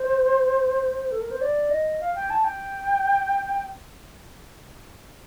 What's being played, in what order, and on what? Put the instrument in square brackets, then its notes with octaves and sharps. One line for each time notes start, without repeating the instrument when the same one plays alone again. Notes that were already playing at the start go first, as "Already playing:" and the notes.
Already playing: [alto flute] C5
A4
A#4
C5
D5
D#5
F5
G5
A5
G5